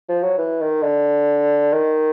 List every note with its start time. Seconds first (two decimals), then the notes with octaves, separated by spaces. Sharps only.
0.09 F3
0.23 F#3
0.38 E3
0.61 D#3
0.83 D3
1.73 D#3